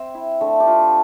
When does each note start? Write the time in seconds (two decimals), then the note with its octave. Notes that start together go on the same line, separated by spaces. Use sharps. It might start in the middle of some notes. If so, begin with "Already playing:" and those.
Already playing: C4 E5
0.15 E4
0.40 D3 A3 A4
0.60 G4
0.67 C4 F4